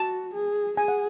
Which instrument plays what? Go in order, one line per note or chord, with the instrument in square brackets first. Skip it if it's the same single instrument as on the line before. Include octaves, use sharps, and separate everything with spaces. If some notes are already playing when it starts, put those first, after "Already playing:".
Already playing: [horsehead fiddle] F#4 [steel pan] A5
[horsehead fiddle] G#4
[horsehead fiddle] G#4 [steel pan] G#5
[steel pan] F#5